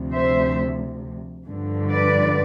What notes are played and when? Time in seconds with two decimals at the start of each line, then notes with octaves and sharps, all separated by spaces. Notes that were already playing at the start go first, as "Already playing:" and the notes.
Already playing: D2 C3 F3
0.13 C5 E5
1.46 G2 D3 F3
1.91 B4 D5